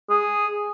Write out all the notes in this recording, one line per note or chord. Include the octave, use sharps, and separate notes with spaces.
G#4